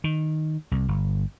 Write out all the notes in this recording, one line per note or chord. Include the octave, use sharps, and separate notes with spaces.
D#3
C2
G1